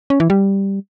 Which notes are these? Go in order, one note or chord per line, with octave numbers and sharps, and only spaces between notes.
C#4
E3
G3